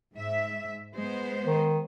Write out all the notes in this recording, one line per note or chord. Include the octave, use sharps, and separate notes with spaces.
G#2 E5
G#3 B3 C5
D#3